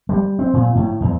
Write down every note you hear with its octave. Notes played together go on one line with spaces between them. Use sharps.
G3
C4
A#2
A2
E2